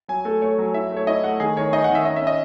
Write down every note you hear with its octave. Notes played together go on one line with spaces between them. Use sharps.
F#3 G#5
A3 A4
A3 C#5
F#3
E4 E5
A3
C#5
E4 D#5
A3 F#5
D#3 G#4
D#3 C#5
D#4 D#5
F#5
D#3
E5
C#4 D#5
E5
C#4
D#5